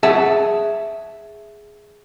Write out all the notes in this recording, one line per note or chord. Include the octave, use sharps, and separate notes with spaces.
G#4 E5 F#5 A5